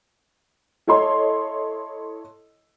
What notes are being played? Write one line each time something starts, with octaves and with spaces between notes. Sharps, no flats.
E4 A4 C#5 D#5 C6